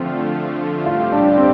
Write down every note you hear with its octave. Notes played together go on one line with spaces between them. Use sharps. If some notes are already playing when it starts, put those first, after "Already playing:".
Already playing: D3 F3 A3 C4 F4
A2 G3 C4 F4 G4
D4
C4